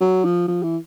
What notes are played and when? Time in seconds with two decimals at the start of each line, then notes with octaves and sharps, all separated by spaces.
0.01 F#3
0.25 F3
0.48 F3
0.63 E3